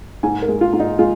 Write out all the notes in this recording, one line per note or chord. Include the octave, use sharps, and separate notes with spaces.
G#2 G#5
A#4
G#3
F4
G#2
D#4
G#3 F4